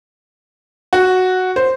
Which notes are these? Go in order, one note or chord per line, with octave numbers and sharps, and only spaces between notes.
F#4
C5